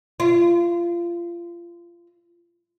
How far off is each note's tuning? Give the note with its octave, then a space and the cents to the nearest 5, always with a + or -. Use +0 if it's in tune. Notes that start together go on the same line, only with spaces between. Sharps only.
F4 -25